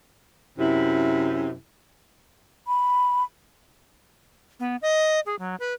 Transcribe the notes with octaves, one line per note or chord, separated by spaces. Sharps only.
F#2 C3 E4
B5
B3
D#5
G#4
F#3
B4